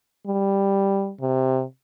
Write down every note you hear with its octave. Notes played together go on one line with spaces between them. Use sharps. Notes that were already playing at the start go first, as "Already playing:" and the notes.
G3
C3